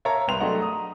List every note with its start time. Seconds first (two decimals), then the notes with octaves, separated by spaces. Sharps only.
0.05 A#4 C#5 E5 F5 A5 A#5
0.28 C2 B4 G5 C6 F7
0.40 F#3 A3 D4 G#4 D#5 F#5
0.59 A#5 D#6